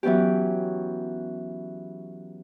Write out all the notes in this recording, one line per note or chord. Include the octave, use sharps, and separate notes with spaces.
E3 F#3 B3 C#4 G4